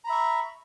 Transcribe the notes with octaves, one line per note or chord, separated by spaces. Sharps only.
E5 A#5 B5 C#6